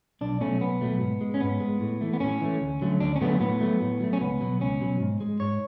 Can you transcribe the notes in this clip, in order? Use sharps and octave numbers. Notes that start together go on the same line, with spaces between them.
B1 D4
B2 F#3 A3 C#4
B1 B3
B2 F#3 A3
G#2
G#3
C#4
G#2 B3
G#3
A2
E3 A3
B3
A2 C#4
E3 A3
D2
D3 F#3 A3
D2 D4
C#4
D3 F#3 A3 B3
A2 B3
F#3 A3
A2
F#3 A3
C#4
C#2 B3
B2 F#3
C#2 C#4
B2 F#3
G#2
G#3
G#2 C#5